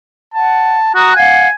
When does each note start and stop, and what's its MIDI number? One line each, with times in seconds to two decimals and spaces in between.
0.34 0.79 78
0.34 0.90 81
0.95 1.15 66
0.95 1.15 82
0.95 1.15 87
0.95 1.15 90
1.16 1.48 77
1.16 1.48 78
1.16 1.53 80